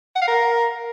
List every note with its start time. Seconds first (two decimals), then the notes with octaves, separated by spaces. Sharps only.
0.16 F#5
0.22 F5
0.28 A#4